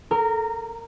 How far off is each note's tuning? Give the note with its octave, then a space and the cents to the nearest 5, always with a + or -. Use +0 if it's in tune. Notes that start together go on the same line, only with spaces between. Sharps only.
A#4 -20 A#5 +10